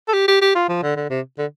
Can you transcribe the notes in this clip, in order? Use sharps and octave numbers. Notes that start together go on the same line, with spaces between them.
A4
G4
G4
G4
F4
F3
D3
D3
C3
D3